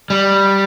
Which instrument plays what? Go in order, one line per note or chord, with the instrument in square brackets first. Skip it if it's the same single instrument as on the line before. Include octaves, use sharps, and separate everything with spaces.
[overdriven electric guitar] G3